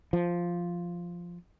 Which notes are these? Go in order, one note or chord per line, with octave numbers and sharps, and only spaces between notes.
F3